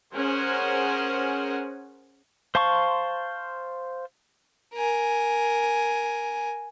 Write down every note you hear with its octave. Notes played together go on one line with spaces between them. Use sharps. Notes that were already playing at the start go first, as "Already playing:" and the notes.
C#4 G#4 A#4 C5 F#5 G#5
C5 F5 A5 C6 C#6
A#4 G#5